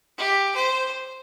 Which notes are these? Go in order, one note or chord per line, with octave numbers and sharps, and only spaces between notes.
G4
C5